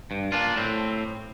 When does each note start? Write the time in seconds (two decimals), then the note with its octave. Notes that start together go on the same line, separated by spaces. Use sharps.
0.11 G2
0.32 A#2 D4 F4
0.57 A2 C4